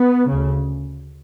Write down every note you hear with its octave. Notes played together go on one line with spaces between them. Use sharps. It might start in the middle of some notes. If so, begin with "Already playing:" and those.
Already playing: B3
D2 C#3